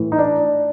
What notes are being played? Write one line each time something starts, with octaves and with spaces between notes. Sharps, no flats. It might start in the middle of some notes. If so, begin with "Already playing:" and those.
Already playing: A2 E3
D#4
D4